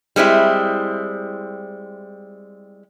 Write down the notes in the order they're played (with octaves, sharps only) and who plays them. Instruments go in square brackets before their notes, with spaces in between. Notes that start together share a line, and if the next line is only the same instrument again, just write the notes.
[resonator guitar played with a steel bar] G3 G#3 C4 E4